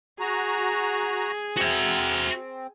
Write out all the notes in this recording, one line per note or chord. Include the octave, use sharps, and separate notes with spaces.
F#4 G#4 A#5
C4 F#4 E5